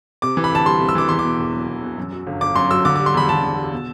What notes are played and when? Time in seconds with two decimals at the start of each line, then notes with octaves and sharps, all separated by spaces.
0.22 C3 D6
0.37 E3
0.44 B5
0.51 D2 A5
0.66 G3 C6
0.81 C3
0.89 E6
0.95 E3 D6
1.09 E2 C6
1.19 D6
1.24 B2
1.39 E1
1.54 F#3
1.68 E2
1.83 B2
1.97 F#2
2.12 F#3
2.27 G1
2.41 G1 D6
2.55 F#2 C6
2.70 F#3 E6
2.85 D3 D6
2.96 G3 D6
3.06 C6
3.14 E2 B5
3.28 E2 A5
3.43 D3
3.58 G3
3.73 B2